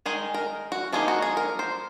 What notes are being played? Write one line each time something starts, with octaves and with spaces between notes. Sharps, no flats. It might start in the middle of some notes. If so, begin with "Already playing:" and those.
D#3 G#3 D#4 G#4
A#4
F#4
F3 A#3 D#4 G#4
F#4
G#4
A#4
C5